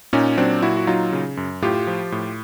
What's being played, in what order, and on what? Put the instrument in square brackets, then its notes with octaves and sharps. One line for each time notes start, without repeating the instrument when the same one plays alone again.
[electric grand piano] A#2 C#4 D#4
F#3 C4 D4
A#2 E4 F#4
F#4
F#3 D#4 F4
C#3
F#2
A2 F4 G4
F3
A2